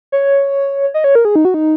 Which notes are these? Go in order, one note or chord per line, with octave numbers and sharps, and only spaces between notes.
C#5
D#5
C#5
A#4
G#4
D#4
F#4
D#4